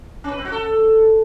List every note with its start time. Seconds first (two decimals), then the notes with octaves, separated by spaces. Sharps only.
0.24 C#4
0.31 B4
0.38 C4
0.45 F#4
0.52 A4